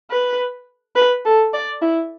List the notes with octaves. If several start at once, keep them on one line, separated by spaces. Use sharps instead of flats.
B4
B4
A4
D5
E4